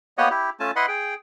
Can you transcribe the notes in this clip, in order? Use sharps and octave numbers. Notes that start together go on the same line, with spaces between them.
A#3 B3 G4 C#5 D#5 F#5
E4 G4
A3 C#4 F4 G#5 A5
E4 B4 D#5 F#5 B5 C6
G#4 G5